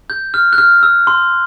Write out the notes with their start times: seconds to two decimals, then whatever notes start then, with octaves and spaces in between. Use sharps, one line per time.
0.10 G6
0.34 F6
0.53 F#6
0.58 F6
0.83 E6
1.07 C6